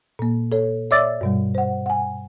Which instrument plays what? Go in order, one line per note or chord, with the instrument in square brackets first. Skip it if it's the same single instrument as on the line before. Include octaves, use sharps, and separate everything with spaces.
[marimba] A#2 A#3
A4 C#5
C#5 D5 E5 D6 E6 A6
G2 B2 G3
C5 F#5
F#5 G#5